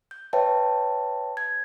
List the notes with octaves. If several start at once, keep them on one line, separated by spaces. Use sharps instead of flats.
G6
B4 C#5 E5 G5 A5
G#6